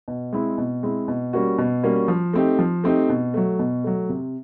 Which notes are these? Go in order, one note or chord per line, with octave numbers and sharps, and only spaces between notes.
B2
G#3 C4 E4
B2
G#3 C4 E4
B2
G3 A#3 C#4 F#4
B2
G3 A#3 C#4 F#4
F3
A3 C4 D#4 G4
F3
A3 C4 D#4 G4
B2
F#3 A3
B2
F#3 A3
C3